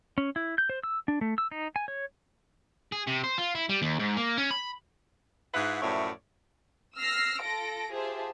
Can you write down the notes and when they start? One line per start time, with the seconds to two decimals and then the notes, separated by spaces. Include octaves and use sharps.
0.18 C#4
0.36 E4
0.58 G6
0.70 C5
0.84 E6
1.08 D4
1.21 A3
1.38 E6
1.51 D#4
1.76 G#5
1.88 C#5
2.92 G#4
3.07 C3
3.23 C5
3.38 F4
3.55 E4
3.69 G3
3.82 D#2
3.99 G#2
4.17 A#3
4.37 C#4
4.51 B5
5.54 G#2 E4 F4 B4 F#5
5.82 F#2 A2 F3 C#5 D5 E5
6.98 E6 F6 A#6 C7
7.42 F4 A4 A#6 D7
7.91 F4 G4 G#4 C5 E5 A5